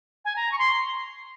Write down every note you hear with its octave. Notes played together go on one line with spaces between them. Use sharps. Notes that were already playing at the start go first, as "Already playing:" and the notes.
G#5
A#5
C#6
C6